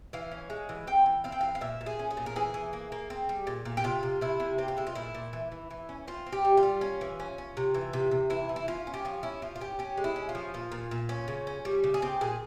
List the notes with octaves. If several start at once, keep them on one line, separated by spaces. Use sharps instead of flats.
E3 F5
C#4
G#3
E3
C4 G5
E3
C4 F5
G5
E3 F5
F5
A#2 E5
A#2
G#4
C#4
G#4
A#2
A#4
E3 G#4
E3
A#3
A#3
C4
G3
A#2
A#2
G4
C3 F4
C3
C3 E4
C3
C4 G4
F4
G#3 E4
F4
A#2 E4
A#2
E3
E3
E3
C#4
C4 F4
C4
G4
G3
F4
G3
C#4
E3
C#4
C#4
C3
E3
C3
C3
E3 E4
E3
E4
C#4 F4
C#4
G4
F3 F4
C#4 E4
F3 F4
F4
C#4 G4
C#4 G4
G#3
E4
C#4
F4
F3
A#2 F4
A#2
A#2
C#4
C#3
C#4
G3
C#3
G#4
C4 G4
A#2 G#4